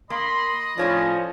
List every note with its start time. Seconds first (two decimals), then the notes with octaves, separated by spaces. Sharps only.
0.10 A#3 D#5 B5 C6
0.78 A2 F3 C#4 C#5 D5